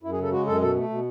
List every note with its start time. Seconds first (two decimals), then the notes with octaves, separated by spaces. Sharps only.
0.03 F#2 E4
0.13 G#4
0.18 C#3 A4
0.32 G#3 F#4
0.47 F#2 A4
0.61 B2 A4
0.76 A3
0.90 B2